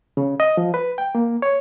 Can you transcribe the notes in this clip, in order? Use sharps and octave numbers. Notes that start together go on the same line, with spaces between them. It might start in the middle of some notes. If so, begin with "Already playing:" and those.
C#3
D#5
F3
B4
G5
A#3
C#5